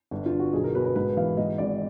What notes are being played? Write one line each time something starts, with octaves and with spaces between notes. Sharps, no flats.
G1 D4
F4
G1
F#4
B1 G#4
A#4
B2 B4
B4
G#2 B4
E3 F5
G#2 D#5
G#1 D5